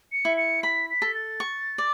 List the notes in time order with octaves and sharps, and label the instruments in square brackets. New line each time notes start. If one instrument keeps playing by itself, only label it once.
[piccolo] C#7
[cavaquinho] E4
[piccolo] C#7
[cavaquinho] B5 [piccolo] B6
[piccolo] B6
[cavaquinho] A4
[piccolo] A6
[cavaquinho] C#6
D5